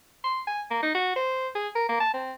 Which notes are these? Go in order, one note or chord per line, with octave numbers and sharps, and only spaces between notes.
C6
G#5
A#3
D#4
F#4
C5
G#4
A#4
A#3
A5
C4